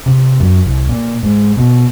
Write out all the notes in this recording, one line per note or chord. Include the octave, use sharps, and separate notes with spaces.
C3
F#2
C2
A#2
G#2
B2